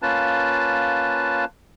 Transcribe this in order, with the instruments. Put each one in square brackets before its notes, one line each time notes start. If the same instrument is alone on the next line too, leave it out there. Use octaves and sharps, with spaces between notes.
[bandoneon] A#3 C#4 F4 B4 A5